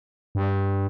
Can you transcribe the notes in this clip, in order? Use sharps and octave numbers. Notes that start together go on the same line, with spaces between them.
G2